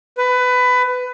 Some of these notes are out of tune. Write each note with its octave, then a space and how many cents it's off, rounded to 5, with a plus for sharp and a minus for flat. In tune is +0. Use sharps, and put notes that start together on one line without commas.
B4 +20